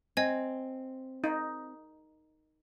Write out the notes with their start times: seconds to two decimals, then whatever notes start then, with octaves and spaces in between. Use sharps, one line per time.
0.17 C4 D#5 G#5 G#6
1.24 D#4